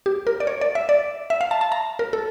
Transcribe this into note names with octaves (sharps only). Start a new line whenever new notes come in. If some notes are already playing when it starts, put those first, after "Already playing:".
G4
A#4
D5
C#5
D5
E5
D5
E5
F5
A5
A5
A#5
A#4
A4